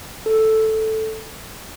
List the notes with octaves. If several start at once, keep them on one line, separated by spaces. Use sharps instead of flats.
A4
A4